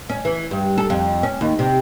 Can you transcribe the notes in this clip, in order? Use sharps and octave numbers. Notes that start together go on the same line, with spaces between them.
C#4
E3
G2
A4
F2
C#4
D#2
C3